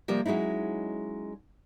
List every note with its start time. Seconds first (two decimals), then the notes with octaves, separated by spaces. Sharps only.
0.08 C3 F3 G3 A#3
0.26 F#3 G#3 C#4 D#4 E4